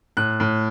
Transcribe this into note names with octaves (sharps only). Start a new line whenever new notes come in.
A2 F#6
A2